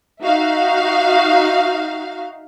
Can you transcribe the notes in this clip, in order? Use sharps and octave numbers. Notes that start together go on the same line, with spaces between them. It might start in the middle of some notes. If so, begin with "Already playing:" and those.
D#4 F#4 E5 F5